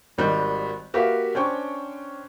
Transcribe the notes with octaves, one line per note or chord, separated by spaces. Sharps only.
G#1 D#3 G3 D#5 F#6 G6
A#3 F#4 G4 B4 E5 F5
C#4 D4 C5 G5 C#6